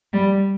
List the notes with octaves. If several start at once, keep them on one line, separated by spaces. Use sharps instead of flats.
G3